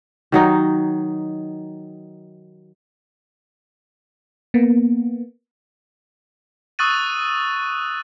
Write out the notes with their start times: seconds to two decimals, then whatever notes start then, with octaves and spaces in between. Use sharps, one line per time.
0.32 D#3 F#3 D#4
4.54 A#3 B3
6.79 C#6 D#6 E6 F#6 A6 D#7